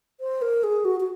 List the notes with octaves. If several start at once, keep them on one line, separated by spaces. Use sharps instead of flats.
C5
A#4
G#4
F#4
F#4